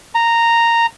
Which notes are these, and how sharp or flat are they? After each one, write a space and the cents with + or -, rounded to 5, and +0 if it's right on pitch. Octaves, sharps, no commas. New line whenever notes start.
A#5 -10